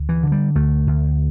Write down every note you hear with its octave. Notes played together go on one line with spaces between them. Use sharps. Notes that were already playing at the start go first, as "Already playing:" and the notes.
Already playing: D2
E3
D3
G3
D2 A3
D2